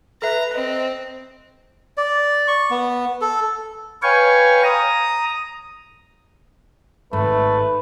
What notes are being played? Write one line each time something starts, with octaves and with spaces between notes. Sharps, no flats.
A4 B4 E5 A#5
C4 D#5
D5
C#6
B3
A4
B4 C#5 F5 G5 G#5 C#6
A#5 D#6
G#1 G#2 A3 B4